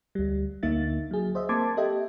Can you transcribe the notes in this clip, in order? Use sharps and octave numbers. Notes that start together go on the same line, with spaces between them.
D2 G3
D2 D3 A#3 D#4 E5 A6
F#3 G#4
C5 D#5 E5
A#3 C4 A5 C6 D6 G#6
G4 A4 D#5 E5 G5